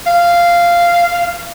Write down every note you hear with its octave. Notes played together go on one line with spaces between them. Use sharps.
F5